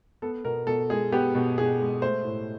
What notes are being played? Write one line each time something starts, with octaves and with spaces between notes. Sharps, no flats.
B3 A4
B2 A#4
B2 A4
G#3 G#4
B3 G4
B2
B2 G#4
G#3
A3 C5
A2